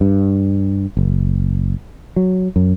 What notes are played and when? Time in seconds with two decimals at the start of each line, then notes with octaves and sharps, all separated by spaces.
0.01 G2
0.97 F#1
2.16 F#3
2.56 F#2